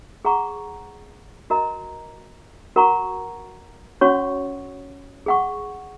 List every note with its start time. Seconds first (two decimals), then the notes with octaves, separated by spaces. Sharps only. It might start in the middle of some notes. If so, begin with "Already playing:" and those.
0.25 G#4 F#5 A#5 C#6
1.50 F#4 A#4 D#5 A#5
2.76 F#4 A#4 F#5 A#5 C#6
4.01 C#4 F#4 C#5 F#5 C#6
5.26 G#4 F#5 C#6